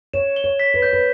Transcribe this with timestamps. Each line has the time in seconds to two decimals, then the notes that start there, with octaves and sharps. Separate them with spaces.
0.13 C#5 E7
0.36 G7
0.44 C#5
0.60 B6
0.74 B4
0.82 C#5 G6
0.93 B4